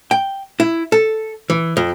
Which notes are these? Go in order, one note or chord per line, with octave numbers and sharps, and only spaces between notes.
G5
E4
A4
E3
F2